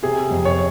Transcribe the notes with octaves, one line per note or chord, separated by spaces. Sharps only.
C3 G#4
F2
C#5